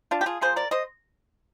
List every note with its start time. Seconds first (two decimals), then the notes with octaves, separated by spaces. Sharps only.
0.11 D4 F4
0.21 G4
0.26 F4 G#4
0.41 F3 A#3 G#4 C5
0.56 A#4 D5
0.71 C5 D#5